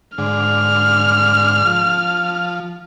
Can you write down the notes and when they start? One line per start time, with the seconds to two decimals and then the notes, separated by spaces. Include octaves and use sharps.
0.18 G#2 D3 F6
1.65 F3